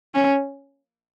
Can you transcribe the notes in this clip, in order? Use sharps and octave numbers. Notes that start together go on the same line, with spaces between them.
C#4